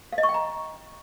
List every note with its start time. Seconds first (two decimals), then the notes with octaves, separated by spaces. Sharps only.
0.13 F5
0.18 D#5
0.23 C#6
0.29 G5
0.34 A#5